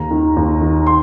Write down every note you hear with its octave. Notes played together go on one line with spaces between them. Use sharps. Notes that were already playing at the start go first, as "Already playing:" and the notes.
Already playing: D#2 A#5
D#3
D#2
D#3
C6